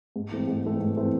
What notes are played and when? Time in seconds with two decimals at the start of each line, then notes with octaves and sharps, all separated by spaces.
0.16 G#2
0.31 E3 A3 C4
0.47 G#2
0.64 E3 A3 C4
0.81 G#2
0.96 E3 A3 C4